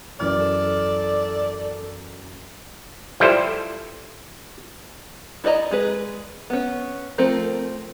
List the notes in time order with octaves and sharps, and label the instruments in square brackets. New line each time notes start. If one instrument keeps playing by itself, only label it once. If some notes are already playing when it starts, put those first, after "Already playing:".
[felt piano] F#2 E3 F6 [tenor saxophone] D5
[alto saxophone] A4
[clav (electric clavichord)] F3 G3 E4 A4 C5
[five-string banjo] E4 A4 D5 D#5 A#5
G#3 G#4 B4
B3 C#4
F3 A3 C4 A#4